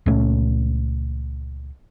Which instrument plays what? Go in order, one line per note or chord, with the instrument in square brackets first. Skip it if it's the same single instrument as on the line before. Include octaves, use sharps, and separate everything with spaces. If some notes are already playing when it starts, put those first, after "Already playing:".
[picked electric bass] C#2 A#2 A3 C#4